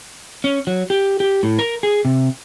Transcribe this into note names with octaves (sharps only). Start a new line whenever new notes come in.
C#4
F#3
G4
G4
A2
A#4
G#4
C3